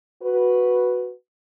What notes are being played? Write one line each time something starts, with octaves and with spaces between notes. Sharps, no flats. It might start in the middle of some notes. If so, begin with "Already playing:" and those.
F#4 B4